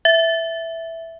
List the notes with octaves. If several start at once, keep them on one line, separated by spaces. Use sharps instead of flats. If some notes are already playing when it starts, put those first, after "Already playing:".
E5